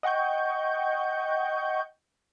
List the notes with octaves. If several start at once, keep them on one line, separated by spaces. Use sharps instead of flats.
D#5 F#5 G5 C#6 G6